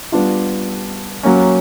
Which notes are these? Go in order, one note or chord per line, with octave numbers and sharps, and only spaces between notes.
G3 B3 D4 F4
F#3 A#3 C#4